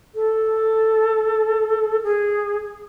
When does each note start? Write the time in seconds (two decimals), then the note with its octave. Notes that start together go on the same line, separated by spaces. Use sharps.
0.14 A4
2.03 G#4